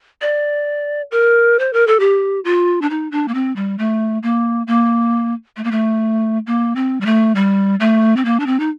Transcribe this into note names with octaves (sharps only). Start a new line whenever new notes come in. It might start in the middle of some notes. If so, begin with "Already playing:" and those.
D5
A#4
C5
A#4
A4
G4
F4
D4
D#4
D4
A#3
C4
G3
A3
A#3
A#3
A3
A#3
A3
A#3
C4
G3
A3
G3
A3
C4
A#3
D4
C4
D#4